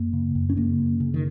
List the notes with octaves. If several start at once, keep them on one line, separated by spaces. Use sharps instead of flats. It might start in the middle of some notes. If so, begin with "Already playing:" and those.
Already playing: F#2 A#3
C#3
F#2
C#4
C#3 A#3
F#2
C#3
D#3